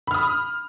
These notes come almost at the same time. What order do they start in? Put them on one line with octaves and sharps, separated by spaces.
B5 F6 D#6